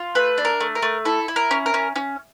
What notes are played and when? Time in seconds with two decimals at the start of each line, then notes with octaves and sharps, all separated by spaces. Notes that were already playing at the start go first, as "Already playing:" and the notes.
Already playing: F4
0.15 A3 B4
0.38 D4
0.45 A#4
0.61 A3
0.75 A#4
0.82 A3
1.05 E4 A4
1.28 E4
1.36 A#4
1.51 C#4
1.66 A#4
1.74 C#4
1.96 C#4